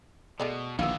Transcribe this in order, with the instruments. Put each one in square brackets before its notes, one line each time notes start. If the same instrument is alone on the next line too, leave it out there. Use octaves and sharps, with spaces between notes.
[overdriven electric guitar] B2 [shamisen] G#3 A3 D5
[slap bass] A#1 [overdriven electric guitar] D3 D#3 [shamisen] B3 E4 [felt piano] F5 E6